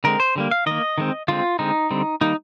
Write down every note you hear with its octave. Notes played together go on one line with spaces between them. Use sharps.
D3 G#3 C4 A#4
C5
D3 G3 A#3
F5
D#3 A#3 D#5
D#3 G#3 C4
D3 G#3 C4 F4
D3 G#3 C4 D#4
D3 G3 C4
D#3 G3 A#3 D#4